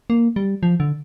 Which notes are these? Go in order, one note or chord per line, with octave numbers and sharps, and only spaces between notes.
A#3
G3
F3
D3